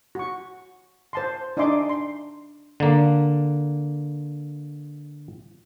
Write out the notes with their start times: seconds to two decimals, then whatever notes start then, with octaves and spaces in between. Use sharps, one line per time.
0.15 F#4 C#6
1.13 C5 A5 C6
1.57 D4 D#4 E5 G#5 C6 D6
1.89 C6
2.80 D3 A#3